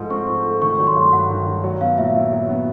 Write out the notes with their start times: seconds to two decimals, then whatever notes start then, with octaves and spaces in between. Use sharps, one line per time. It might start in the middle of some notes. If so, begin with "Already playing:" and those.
Already playing: G#2 F3 A3
0.10 C4 C#6
0.28 F3
0.45 A3
0.61 D#3 C#6
0.79 F#3
0.87 C6
0.96 G2
1.13 G2 F#5
1.30 D#3
1.47 F#3
1.64 F#3
1.81 B3 F5
1.98 A#2 E5
2.15 E4
2.32 F#3
2.49 B3